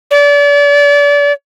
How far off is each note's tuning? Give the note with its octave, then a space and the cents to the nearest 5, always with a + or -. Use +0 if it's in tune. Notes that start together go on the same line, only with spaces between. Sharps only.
D5 -35